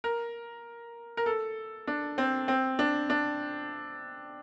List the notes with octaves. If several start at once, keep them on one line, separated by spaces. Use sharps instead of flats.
A#4
A#4
A4
D4
C4
C4
D4
D4